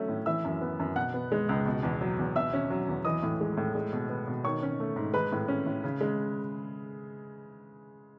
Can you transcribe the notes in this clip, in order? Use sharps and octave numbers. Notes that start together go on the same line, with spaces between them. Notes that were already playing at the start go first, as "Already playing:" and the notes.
Already playing: F#3 A3 C#4 E5
A2
E3 E5 E6
F#2
B3
F#2
B2 F#5 F#6
B3
G#3
C#2
B2
E2
F#3
E2
B2 E5 E6
C#4
F#3
E2
E3 D#5 D#6
A2
G#3
A2
G#3
B2
B3
B2
D#3 C#5 C#6
C#4
A3
G#2
G#3 B4 B5
A2
C#4
A2
C#3
G#3